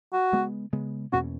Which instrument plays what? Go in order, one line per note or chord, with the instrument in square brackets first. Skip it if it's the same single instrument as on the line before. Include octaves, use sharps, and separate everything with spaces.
[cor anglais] F#4
[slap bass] C#3 G#3 B3
C#3 G#3 B3
[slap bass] E2 B2 A#3 C#4 [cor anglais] F#4